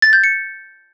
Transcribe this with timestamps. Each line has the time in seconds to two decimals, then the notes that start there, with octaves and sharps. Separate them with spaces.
0.02 A6
0.13 G6
0.24 C#7